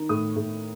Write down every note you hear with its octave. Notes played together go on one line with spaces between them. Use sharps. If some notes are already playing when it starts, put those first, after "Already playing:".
Already playing: D#3 D#4
A2 D#6
A2